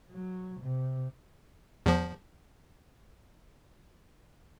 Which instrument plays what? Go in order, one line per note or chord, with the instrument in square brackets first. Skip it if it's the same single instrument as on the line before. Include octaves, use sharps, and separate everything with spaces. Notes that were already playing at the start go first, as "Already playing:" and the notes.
[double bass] F#3
C3
[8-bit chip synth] E2 F3